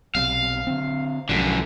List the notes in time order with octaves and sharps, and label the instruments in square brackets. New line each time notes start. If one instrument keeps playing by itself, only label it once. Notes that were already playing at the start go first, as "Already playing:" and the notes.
[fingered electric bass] B1 C3 [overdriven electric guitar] F5
[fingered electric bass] D3 C4
[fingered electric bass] B1 F3 G#3 [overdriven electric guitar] F#2 D3